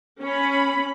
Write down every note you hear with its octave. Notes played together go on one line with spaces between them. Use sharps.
C#4 B5